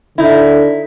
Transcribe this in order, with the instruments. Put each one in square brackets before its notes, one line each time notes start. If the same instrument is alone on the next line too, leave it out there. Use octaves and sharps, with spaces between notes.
[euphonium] D3 [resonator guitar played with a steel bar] D#4 E4